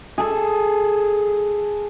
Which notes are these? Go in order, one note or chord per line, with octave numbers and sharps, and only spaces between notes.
G#4 A4